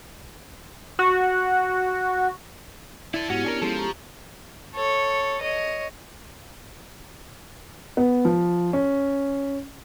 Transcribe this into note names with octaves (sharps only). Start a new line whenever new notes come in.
F#4
E4 A4 D5
G#2 B3 C#4 E4 F#4 G4
D4 G#4 A#4
F3 G#3 C#4 A4
G4 A#5 C#6
A4 C#5
C#5 D#5
B3
F3
C#4